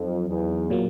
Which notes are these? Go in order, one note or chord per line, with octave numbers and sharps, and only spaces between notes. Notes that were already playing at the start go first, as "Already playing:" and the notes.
Already playing: F2 F#3 D#4
E2
A#2 F#3 A#3